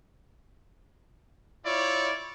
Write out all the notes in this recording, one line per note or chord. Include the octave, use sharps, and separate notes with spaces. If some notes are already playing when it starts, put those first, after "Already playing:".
E4 F4 C#5 D5